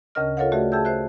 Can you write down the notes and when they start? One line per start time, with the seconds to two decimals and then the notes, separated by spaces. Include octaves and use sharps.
0.15 D2 C#3 C#4 A#4 D#5 F6
0.37 F4 A4 A#4 C#5 F5 F#5
0.52 A3 F#4 G#4 D5 E5
0.72 G#4 E5 G5 A5 E6 G6
0.85 C5 E5 F#6